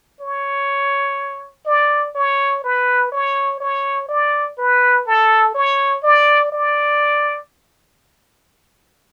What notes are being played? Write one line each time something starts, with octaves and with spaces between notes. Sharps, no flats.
C#5
D5
C#5
B4
C#5
C#5
D5
B4
A4
C#5
D5
D5